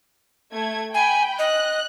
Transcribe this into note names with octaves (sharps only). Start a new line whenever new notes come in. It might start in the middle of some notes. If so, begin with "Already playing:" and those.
A3 G#6
G5 G#5 B5
D#5 F#6